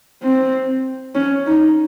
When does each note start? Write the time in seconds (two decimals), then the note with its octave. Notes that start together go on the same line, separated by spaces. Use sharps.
0.23 C4
1.15 C#4
1.47 D#4